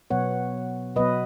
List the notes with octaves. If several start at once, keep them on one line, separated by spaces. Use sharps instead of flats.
B2 F#3 B3 C#5 F#5
B2 F#3 B3 B4 D#5